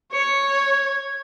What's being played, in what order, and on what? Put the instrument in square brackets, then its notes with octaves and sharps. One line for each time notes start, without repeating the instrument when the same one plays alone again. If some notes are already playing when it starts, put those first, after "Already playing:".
[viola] C#5 [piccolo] C#7
[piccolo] G#6